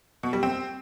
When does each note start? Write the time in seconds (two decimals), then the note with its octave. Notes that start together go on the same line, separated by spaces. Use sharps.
0.23 B2
0.33 G3
0.43 C4